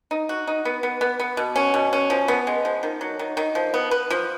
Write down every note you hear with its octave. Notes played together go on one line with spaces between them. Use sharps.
D#4
F#4
D#4
B3
B3
B3
B3
B2
C#4
B2
C#4
F3
B3
G#3
F3
D#3
F#3
D#3
D#3
F3
B3
B4
F3